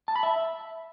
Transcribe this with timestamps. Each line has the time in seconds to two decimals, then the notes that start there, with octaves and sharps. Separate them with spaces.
0.08 A5
0.16 B5
0.23 E5